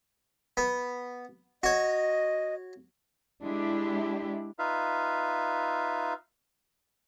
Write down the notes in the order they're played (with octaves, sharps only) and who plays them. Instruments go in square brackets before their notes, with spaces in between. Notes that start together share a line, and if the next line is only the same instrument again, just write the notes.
[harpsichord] B3
[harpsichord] F#4 C#5 [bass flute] D#5
[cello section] G#3 D4 E4 G4
[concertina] D#4 F4 B4 E5 F5